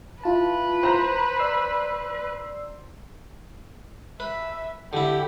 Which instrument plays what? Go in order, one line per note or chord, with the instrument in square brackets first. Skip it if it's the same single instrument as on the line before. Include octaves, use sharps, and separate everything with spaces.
[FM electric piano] E4 F4 A5 [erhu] B4
[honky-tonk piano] C5 A#5
[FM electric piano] D5 E6 C7
[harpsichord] B4 [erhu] E5
[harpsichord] D3 E4 [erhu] G4